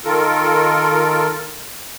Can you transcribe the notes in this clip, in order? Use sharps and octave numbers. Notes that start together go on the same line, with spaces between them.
D#3 F4 A4 A#4